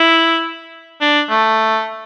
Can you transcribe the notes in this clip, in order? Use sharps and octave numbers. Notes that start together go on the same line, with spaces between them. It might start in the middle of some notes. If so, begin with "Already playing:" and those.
Already playing: E4
D4
A3